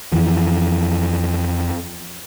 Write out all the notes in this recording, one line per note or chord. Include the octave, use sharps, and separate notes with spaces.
F2 E3 F3